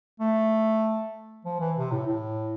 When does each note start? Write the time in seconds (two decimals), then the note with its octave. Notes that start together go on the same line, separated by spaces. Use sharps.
0.20 A3
1.45 F3
1.60 E3
1.77 C3
1.91 A2
2.07 A2